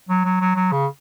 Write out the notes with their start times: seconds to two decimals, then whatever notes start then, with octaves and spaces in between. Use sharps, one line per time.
0.09 F#3
0.25 F#3
0.41 F#3
0.56 F#3
0.72 C#3